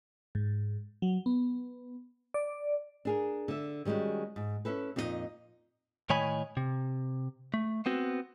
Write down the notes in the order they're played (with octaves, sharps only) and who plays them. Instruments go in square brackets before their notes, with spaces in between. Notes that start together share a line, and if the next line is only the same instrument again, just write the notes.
[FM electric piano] G#2
F#3
B3
D5
[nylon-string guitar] D4 G#4 A#4
D3 E5
D#3 G3 G#3 C#4 F#4
G#2
C#4 E4 A4 B4
F2 A#2 D#4 F4 D#5
[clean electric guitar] A2 D#3 C#5 D#5 G#5 B5
C3
A3
B3 C4 F#4